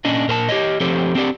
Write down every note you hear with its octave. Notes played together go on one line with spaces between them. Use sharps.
A#2 C#4 D4 D#5
A#2 A#4 C5 A5
G4 C#5 D#5
F3 C4 G4 A4 C5 C#5
C4 D4 G4 D5